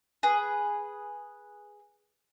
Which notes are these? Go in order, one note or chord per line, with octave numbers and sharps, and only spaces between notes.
G#4 B4